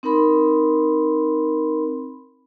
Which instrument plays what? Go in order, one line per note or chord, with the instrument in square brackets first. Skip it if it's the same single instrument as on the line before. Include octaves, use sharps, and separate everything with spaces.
[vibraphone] C4 D#4 A#4 B5 C6